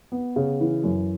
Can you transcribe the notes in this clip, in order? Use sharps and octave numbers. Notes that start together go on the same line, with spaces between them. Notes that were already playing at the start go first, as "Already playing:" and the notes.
B3
C#3
E3
F#2